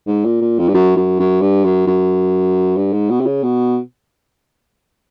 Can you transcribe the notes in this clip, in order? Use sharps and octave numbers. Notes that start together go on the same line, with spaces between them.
G#2
A#2
A#2
F2
G2
F#2
F#2
F#2
G2
F#2
F#2
G2
G#2
B2
C3
C#3
B2